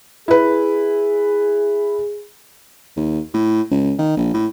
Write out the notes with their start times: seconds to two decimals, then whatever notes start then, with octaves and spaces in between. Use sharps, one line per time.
0.28 E4 G#4 B4
2.97 D#2
3.34 A2
3.71 C#2
3.99 D#3
4.17 A#1
4.34 A2